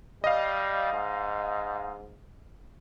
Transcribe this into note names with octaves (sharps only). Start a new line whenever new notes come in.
G3 D#5 F5
G#2